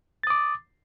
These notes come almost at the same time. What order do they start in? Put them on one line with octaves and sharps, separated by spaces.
A6 D#6 D6